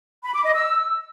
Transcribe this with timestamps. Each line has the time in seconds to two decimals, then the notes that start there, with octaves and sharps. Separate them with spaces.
0.24 B5
0.34 D6
0.45 D#5
0.55 E6